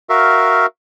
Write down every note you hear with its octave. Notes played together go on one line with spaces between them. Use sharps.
F#4 A#4 E5 F5